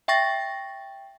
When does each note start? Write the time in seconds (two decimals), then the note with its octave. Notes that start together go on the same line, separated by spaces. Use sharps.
0.08 E5 G5 C#6 A6 A#6